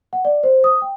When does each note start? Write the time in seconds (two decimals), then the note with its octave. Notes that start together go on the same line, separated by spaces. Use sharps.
0.13 F#5
0.25 D5
0.43 C5
0.64 D#6
0.82 G5